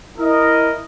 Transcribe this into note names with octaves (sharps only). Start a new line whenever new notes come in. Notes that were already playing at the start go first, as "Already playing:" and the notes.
E4 A#4 D#5